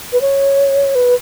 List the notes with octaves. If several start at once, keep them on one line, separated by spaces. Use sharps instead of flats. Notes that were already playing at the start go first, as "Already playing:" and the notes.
B4
C#5
B4